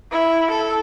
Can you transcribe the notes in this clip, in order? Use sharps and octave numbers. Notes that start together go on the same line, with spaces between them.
E4
A4